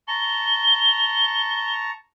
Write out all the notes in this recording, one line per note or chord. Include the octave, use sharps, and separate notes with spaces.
A5 A#5 C#6 G7